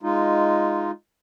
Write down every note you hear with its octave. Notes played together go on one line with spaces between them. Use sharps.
G#3 D#4 F4